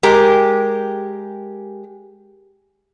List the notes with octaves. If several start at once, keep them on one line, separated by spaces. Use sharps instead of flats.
G#3 G4 A#4